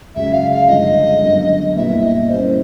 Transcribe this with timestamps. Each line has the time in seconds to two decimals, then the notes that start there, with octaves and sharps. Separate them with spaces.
0.15 C#2 C#3 F#3 E5
0.33 F5
0.51 F5
0.68 G2 D3 F3 G#3 D#5
1.22 F#2 D3 G3 B3
1.76 C2 A#2 G3 B3 E4 E5
2.03 D#5
2.30 E3 G3 A#3 C#4 C5